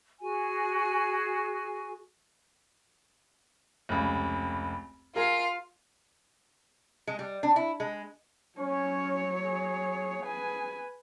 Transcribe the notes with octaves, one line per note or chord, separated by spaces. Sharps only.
F#4 G#4 G#5
F1 C#2
F4 G#4 A#4 F5
G#3
G3
D4
E4
G#3
F#3 C#4 C#5
G#4
B4 G#5